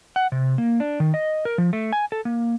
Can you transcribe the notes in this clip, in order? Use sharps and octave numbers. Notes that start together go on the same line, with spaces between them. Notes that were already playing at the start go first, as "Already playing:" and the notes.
F#5
C3
A#3
D4
D#3
D#5
A#4
F3
A3
G#5
A4
A#3